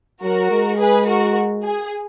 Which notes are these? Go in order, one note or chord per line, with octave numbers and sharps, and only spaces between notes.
F#3 F#4 A#4
G#3
G#4 B4
F#4 A#4
G#4